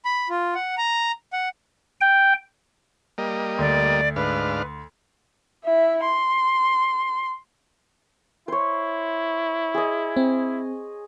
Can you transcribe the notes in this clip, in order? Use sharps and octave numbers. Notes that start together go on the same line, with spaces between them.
B5
F4
F#5
A#5
F#5
G5
G3 A#3 D#5
D2 D5
G#2 D4 B4 F5
E4 E5
C6
E4 C5 C#5
G#4 D#5
C4